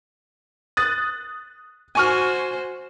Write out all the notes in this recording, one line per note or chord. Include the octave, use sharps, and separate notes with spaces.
D#6 F#6 A6
F#4 C5 G#5 C#6 F6